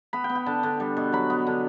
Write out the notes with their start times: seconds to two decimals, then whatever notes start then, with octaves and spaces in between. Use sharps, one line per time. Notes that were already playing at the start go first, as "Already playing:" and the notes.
0.13 B3 B5
0.24 G5
0.30 B3
0.35 G5
0.46 D3 A5
0.63 D3
0.80 G3
0.97 B2
1.12 F#3 B5
1.30 B3
1.47 D3